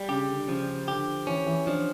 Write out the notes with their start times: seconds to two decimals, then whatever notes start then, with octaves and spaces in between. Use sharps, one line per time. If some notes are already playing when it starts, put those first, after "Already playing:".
Already playing: G3
0.09 C#3 G4
0.28 D3
0.48 C#3 F3
0.88 D3 G4
1.27 E3 C#4
1.46 E3
1.66 F3 D4